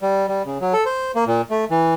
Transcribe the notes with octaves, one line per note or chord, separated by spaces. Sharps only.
G3
G3
C#3
F#3
A4
C5
A#3
A#2
A3
E3